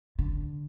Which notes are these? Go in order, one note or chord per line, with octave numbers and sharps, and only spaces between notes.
D3